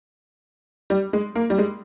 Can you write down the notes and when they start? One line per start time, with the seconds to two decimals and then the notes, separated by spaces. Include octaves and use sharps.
0.90 G3
1.13 G#3
1.35 A#3
1.50 G3
1.58 G#3